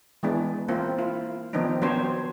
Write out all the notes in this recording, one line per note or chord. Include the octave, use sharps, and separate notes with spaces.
E3 G#3 B3 D4
A#3 C4 E4 F4
E4 F4
D#3 F3 B3 C4 D4 D#4
F#3 B3 C4 D4 C5 C#5